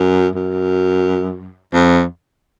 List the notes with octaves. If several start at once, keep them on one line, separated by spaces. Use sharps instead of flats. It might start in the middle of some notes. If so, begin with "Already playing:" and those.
Already playing: F#2
F#2
F2